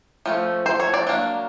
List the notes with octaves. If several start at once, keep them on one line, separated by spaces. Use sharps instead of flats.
F3 A3 C#4
C5
C#5
D5
F#3 A#3 D4